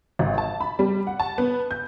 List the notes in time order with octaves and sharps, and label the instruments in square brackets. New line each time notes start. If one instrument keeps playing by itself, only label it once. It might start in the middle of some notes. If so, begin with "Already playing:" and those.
[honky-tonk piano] G#1
A5
B5
G3
F#5
A5
B3
G6